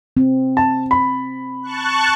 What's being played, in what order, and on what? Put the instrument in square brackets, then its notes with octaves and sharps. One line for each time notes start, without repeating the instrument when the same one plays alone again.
[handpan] C4
[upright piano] A5
B5
[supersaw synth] A5 C#6 F#6